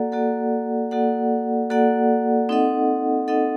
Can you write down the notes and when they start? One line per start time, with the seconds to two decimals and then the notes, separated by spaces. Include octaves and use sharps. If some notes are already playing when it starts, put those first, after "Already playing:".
Already playing: A#3 F#4 A4 D5 F#5
0.12 A#3 F#4 A4 D5 F#5
0.91 A#3 F#4 A4 D5 F#5
1.70 A#3 F#4 A4 D5 F#5
2.49 C4 D#4 A4 D#5 F#5
3.28 C4 D#4 A4 D#5 F#5